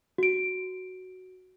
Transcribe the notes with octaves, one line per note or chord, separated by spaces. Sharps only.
F#4 D7